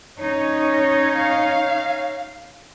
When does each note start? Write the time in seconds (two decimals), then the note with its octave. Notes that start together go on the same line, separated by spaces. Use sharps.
0.19 C#4 D#4 C#5
1.16 F5